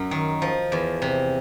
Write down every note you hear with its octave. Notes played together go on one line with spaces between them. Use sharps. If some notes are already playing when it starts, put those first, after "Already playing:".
Already playing: F#2 F#3
D#3
F3
E2
C3